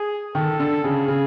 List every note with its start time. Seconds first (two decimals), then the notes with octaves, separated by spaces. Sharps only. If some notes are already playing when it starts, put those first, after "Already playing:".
Already playing: G#4
0.35 D#3 A4
0.60 D3
0.84 C#3 G#4
1.08 C#3